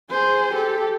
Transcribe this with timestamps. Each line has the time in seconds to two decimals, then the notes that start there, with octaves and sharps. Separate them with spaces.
0.10 G#4 C5
0.54 G4 A4